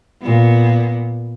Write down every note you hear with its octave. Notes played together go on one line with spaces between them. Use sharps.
A#2 B3